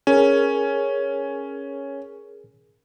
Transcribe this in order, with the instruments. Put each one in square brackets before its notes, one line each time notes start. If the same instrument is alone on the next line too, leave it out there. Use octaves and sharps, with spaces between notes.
[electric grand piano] C#4 [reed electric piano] G#4 A#4